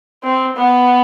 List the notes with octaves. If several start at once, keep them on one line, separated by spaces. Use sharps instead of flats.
C4
B3